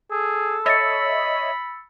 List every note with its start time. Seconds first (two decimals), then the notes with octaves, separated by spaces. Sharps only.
0.11 G#4 A4
0.66 C#5 D#5 E5 B5 E6 A6 C#7